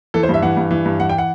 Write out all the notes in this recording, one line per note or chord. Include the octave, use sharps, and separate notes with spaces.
E3 A4
C5
G2 E5
E3 F#5
G2
E3
G2
E3 F#5
G5
F#5